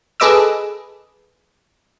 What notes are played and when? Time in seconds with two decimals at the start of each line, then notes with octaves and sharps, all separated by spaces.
0.20 G#4 A4 B4 D#5 D6 E6